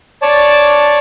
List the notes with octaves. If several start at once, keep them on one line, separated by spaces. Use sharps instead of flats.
C#5 D5 A5